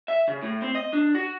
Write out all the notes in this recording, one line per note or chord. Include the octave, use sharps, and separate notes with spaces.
E5
C#3
A2
C4
D#5
D4
F#4